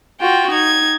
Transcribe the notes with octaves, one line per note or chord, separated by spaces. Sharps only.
F4 F#4 G5
D#4 G#6